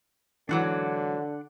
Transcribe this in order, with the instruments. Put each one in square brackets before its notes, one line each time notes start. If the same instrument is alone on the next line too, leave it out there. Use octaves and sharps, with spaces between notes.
[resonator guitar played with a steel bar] G#2 E3 F#3 [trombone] D3 [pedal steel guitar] D4 F#5 D6